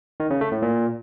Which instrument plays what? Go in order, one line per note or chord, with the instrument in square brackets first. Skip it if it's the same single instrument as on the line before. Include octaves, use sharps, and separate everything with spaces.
[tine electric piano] D#3
C#3
A3
A2
A#2